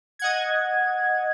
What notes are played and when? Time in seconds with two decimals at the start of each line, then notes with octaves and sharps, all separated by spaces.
0.19 D#5 F#5 G#6